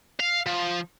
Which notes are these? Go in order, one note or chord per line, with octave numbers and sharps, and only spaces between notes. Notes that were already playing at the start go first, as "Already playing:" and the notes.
F5
F3